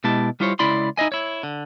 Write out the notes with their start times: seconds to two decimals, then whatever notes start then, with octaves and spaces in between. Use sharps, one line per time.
0.04 B2 G#3 E4 G4 A5
0.40 G3 E4 F4 C5 C#5
0.59 C#2 E4 D5 B5 C6
0.97 D#4 E4 D#5 G#5
1.12 E4 C#5
1.43 D3